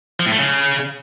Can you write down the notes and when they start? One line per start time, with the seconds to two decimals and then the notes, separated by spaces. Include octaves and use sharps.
0.20 F3
0.26 A2
0.32 A3
0.38 C#3